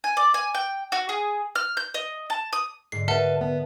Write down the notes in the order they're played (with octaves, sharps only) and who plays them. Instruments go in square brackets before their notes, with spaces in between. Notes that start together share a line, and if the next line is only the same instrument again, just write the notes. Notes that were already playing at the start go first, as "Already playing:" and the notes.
[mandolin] G#5
D5
G#5
G5
F#4
G#4
F6
G6
D#5
A5
D#6
[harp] G#2 D3 [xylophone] C7
[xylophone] A#4 E5 F#5 [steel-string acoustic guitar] B4 A5
[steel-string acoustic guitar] B3